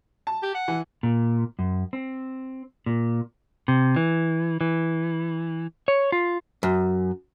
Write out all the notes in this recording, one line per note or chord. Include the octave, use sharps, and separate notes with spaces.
A5
G4
F#5
E3
A#2
F#2
C4
A#2
C3
E3
E3
C#5
F4
F#2